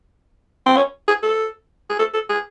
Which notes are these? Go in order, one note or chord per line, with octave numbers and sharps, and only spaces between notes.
C4
C#4
G#4
A4
G#4
A4
A4
G#4